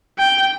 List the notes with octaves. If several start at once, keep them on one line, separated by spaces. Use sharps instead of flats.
G5